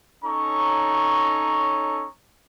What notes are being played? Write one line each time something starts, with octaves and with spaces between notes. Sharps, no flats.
C#4 D#4 A4 C#5 A#5 C#6